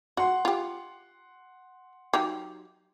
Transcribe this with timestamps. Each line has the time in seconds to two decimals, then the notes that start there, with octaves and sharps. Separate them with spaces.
0.17 F#4 F#5 C6
0.45 F4 G4
2.13 F#3 D#4 G4